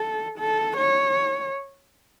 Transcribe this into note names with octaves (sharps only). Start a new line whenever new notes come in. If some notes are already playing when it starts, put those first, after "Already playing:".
Already playing: A4
A4
C#5